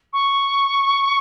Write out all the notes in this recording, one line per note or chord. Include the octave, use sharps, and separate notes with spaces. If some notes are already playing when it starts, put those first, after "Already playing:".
C#6